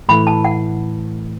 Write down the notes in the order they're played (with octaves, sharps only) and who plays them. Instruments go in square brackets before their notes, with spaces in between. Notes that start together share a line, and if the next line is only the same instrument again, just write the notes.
[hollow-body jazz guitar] A2 E3 A3 [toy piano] B5
[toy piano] A5
F#5